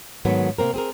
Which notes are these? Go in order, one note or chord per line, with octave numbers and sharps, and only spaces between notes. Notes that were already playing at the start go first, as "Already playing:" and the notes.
G#2 D#3 F#3 A3 B3
C3 A#3 C4 A#4
C4 G#4 A#4